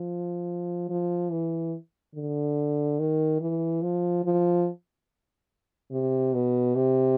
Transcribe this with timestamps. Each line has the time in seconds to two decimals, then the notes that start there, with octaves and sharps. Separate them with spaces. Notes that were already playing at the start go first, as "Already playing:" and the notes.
Already playing: F3
0.89 F3
1.31 E3
2.15 D3
2.99 D#3
3.41 E3
3.82 F3
4.25 F3
5.92 C3
6.34 B2
6.76 C3